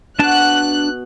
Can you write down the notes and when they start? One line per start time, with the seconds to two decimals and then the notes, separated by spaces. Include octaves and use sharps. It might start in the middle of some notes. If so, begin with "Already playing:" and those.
0.19 B2 D4 A5 F#6